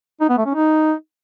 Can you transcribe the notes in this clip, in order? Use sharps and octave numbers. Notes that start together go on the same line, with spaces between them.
D#4
B3
A3
C#4
D#4